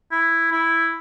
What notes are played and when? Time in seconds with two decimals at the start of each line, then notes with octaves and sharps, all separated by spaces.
0.11 E4
0.52 E4